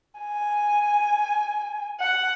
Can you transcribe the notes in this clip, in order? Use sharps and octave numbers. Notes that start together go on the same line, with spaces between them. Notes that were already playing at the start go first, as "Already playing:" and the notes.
G#5
F#5